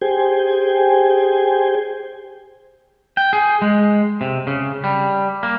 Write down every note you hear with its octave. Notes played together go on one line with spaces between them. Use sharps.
G4 G#4 C5 G5 G#5
G5
G#4
G#3
C3
C#3
G3
A#3